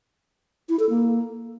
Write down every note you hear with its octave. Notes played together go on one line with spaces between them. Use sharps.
E4
A4
A#3